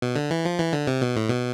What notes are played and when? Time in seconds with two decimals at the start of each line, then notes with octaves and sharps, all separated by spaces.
0.02 B2
0.16 D3
0.31 E3
0.45 F3
0.59 E3
0.73 D3
0.87 C3
1.02 B2
1.16 A2
1.29 B2